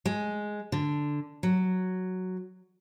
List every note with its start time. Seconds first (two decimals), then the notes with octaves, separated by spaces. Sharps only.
0.05 G#3
0.72 D3
1.43 F#3